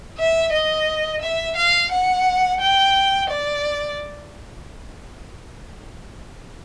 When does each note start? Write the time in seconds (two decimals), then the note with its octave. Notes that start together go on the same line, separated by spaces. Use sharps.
0.18 E5
0.53 D#5
1.21 E5
1.56 F5
1.91 F#5
2.61 G5
3.30 D5